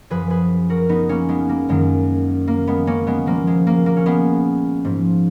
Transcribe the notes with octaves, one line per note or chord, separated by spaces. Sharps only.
F#2 F3 G#4 B4
G#4 B4
F#4 A#4
B3 D#4
A#3 C#4
G#3 B3
A#3
F#2 D#3 G#3
A#3
G#3 B3
A#3 C#4
G#3 B3
A#2 F3 A#3
G#3
A#3
A#3
C#4
G#3 B3
G#2 F3